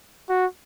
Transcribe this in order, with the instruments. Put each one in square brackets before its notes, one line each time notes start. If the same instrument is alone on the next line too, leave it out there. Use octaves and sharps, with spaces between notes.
[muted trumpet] F#4